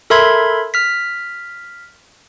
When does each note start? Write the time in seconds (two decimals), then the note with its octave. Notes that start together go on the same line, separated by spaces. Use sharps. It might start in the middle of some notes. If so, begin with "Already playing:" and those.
0.10 A4 A#4 E5 B5 C6 G#6
0.74 F6 B6